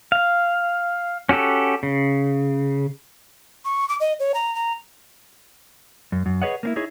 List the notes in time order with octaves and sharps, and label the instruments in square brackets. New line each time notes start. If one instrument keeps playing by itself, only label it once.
[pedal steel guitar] F5
C#4 F#4 G4 A4
C#3
[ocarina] C#6
D6
D#5
C#5
A#5
A#5
[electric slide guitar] F#2
F#2
G#4 B4 C#5 D#5 F#5
A#3 C4 E4
D#4 E4 G#4 C#5